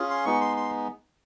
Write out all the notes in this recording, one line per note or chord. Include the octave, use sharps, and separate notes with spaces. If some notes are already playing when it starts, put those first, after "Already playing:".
Already playing: C#4 F4 G#4
C6
G#3 B3 D#4 C#6
C6
C6